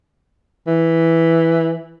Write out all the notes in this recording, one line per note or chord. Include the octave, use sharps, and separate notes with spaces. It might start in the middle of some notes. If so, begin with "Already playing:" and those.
E3